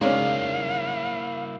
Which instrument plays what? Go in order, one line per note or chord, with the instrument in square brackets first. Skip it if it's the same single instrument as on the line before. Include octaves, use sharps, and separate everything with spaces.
[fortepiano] G#3 C#4 [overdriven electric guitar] A#3 E4 [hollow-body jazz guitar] D#4 C#5 D5 [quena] F5